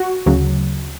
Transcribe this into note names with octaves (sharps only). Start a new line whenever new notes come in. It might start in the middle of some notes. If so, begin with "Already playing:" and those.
Already playing: F#4
D2 C#3 F#3